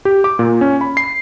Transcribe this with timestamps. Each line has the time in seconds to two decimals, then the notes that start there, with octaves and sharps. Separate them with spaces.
0.05 G4
0.24 D6
0.39 A#2
0.61 C#4
0.81 B5
0.97 C7